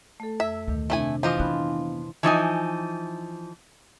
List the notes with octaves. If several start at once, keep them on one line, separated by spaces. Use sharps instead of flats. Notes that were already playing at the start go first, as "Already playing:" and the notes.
A3 A4
F2 E5 E6
D2 A#2 D#3
C3 A3 C4 D4 E4 G#5
E3 F3 F4 D#5 G#5 D6 G6
B3 D4 B5 F#6
E3 F3 D#4 G#5